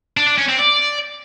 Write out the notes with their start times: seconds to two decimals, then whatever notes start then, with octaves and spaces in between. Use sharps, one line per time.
0.17 D4
0.28 D4
0.38 C#4
0.48 C4
0.59 D5